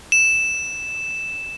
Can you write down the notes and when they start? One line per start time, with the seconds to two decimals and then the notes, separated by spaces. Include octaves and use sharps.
0.12 E7